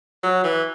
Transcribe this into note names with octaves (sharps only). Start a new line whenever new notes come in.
F#3
E3